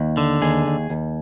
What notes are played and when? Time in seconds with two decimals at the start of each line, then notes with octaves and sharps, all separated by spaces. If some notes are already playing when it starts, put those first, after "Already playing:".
Already playing: D#2
0.17 D3
0.42 D#2 G#4
0.67 D#2
0.90 D#2